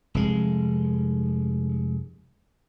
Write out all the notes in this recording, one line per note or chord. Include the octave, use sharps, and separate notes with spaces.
F1 G#3